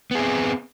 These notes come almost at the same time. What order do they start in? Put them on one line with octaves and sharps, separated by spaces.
B3 G#4 C4